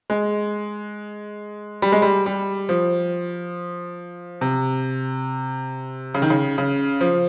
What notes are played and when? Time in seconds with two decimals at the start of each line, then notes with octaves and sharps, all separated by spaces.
0.10 G#3
1.82 G3
1.92 G#3
2.02 G3
2.26 G3
2.69 F3
4.41 C3
6.15 C#3
6.22 D#3
6.30 C#3
6.58 C#3
7.01 F3